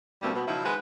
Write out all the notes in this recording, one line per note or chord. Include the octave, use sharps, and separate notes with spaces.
D2 B2 G3 A3 A#3 C4
B2 B3
C#3 F3 F#3 D#4 E4
D#3 G#3 G#4 B4 C5 F#5